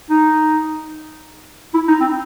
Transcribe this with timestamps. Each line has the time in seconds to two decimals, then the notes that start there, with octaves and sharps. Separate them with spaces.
0.10 D#4
1.74 E4
1.88 D#4
2.01 C4